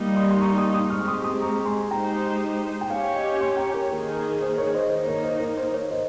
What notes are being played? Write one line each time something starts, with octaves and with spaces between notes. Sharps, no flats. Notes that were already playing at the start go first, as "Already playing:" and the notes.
Already playing: G3 A#3 D#4
C6 D#6
C6
A#5 C#6
C6 D#6
C6 D#6
G#3 C4 G4 C#6 F6
C#6
C6 D#6
C6 D#6
A#5 C#6
G#5 C6
G#3 D#4 G4 C5 G5 A#5
G5
C#4 G4 C#5 F5 G#5
D#5 G5
G#5 C6
G5 A#5
A#4 C#5
D#3 A#3 D#4 G#4 A#4
A#4
A#4
C5
A#4 C#5
C5 D#5
D#3 A#3 D#4 C5 D#5
A#4 C#5
C5
A#4
C5
A#4 C#5
C#5
C5 D#5